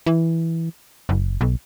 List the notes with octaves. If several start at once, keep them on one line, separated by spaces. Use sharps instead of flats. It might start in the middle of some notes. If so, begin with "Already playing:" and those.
E3
F#1
B1